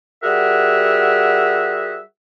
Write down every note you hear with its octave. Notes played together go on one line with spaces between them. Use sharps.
G3 F#4 G#4 A#4 E5 F#5